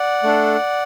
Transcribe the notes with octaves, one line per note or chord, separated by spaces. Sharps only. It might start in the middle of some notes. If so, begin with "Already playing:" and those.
Already playing: D5 F#5
A3 D4 A4